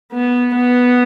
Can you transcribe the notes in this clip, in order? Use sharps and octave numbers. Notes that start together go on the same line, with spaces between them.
B3
B3